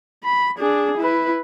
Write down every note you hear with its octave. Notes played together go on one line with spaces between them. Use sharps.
B5
D4 G#4
E4 B4